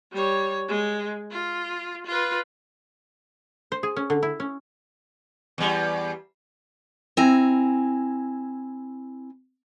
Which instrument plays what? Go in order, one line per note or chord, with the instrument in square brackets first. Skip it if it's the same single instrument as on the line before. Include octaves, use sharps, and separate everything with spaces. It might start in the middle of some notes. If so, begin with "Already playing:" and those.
[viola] G3 C#5
G#3
F4
F4 B4
[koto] C5
G#4
C#4
D3
E4
C#4
[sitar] E2 G3
[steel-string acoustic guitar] C4 E4 G#5 A#5